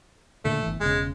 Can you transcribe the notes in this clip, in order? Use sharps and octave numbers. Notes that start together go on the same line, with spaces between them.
A#2 D3 A3
G1 E3
E1 C#3 G#3